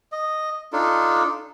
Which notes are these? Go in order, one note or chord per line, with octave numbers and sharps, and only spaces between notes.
D#5
D4 D#4 F4 A4